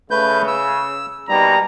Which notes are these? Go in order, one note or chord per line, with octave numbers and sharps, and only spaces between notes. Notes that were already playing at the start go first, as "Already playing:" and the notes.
C#3 A3 B4 G6
E6
B2 G3 A#3 D#4 A#5